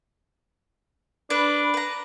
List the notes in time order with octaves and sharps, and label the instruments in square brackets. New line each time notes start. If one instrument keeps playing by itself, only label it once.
[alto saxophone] D4 [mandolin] B4
[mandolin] B4 A#5